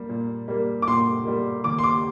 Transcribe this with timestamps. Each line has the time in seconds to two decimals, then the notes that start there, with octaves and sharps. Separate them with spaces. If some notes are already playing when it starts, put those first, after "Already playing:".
Already playing: G3 A#3
0.09 A#2
0.48 G3 A#3
0.82 D6
0.87 A#2 C6
1.25 G3 A#3
1.64 D#2 D6
1.79 C6
1.84 D6